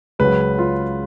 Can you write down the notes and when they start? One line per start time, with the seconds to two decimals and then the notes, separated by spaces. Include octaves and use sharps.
0.19 C#2 C#3 F#3 B4
0.58 F4